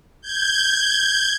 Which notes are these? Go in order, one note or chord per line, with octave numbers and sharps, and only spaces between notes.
G6 G#6